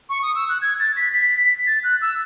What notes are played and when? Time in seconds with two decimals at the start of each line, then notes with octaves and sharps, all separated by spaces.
0.10 C#6
0.23 D#6
0.35 E6
0.49 F#6
0.62 G#6
0.80 A6
0.97 B6
1.14 B6
1.67 A6
1.84 F#6
2.02 E6